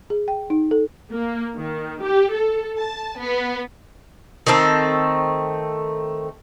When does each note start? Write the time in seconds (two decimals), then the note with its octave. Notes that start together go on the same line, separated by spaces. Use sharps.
0.10 G#4
0.28 G5
0.50 D#4
0.71 A4
1.12 A#3
1.57 D#3
2.03 G4
2.32 A4
2.78 A5
3.20 B3
4.47 D#3 A3 C4 A4